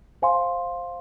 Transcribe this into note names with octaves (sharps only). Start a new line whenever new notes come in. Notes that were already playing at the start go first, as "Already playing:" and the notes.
C5 F5 G#5 C6